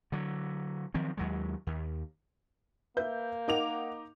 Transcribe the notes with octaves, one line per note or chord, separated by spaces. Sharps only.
D3 F#3
D#3 F3 F#3 C4
D#2 F#3 G#3
D#2
A#3 B4 E5 G6
D#4 A#4 F#5 D6 F7